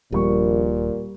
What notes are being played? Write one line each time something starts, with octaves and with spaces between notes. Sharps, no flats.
D#1 A#1 A#2 G3 C#6